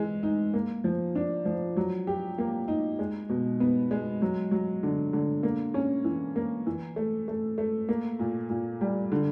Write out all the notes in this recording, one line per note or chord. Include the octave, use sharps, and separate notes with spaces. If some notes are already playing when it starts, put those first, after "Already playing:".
Already playing: E3 G#3
D#4
A#3
F3
D4
F3
F#3
G4
A#3
D#4
G#3
B2
B3
G#3
F#3
F#3
D3
D3
A#3
C#4
E3
A#3
E3
A3
A3
A3
A#3
A#2
A#2
G3
D3